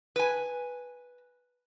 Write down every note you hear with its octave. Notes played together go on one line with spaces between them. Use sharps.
B4 G#5